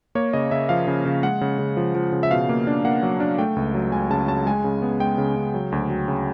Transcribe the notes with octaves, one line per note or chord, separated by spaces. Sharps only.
A#3 C#5
C#3 D#5
C#3 E5
F3 F5
C#3
C#3
G#3 F#5
C#3
C#3
F3
F3
C#3
E5
B2 F5
A#3
D4
A#3 F#5
F#3
D4
A3 G5
C#2
F#3
C#2 G#5
C#3 A5
F#3 A5
G#3 G#5
C#3
B3
G#3 G5
C#3
C#3
F#3
D2
F#3
C#3